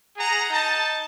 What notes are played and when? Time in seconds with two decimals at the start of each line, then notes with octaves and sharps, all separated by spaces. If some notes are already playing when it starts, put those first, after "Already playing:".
0.17 G#4 F#5 A#5
0.50 D#4 A5